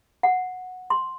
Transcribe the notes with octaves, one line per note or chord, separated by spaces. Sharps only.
F#5
C6